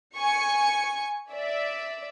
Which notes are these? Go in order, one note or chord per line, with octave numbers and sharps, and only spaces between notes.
G#5 C#6 C#7
D5 E5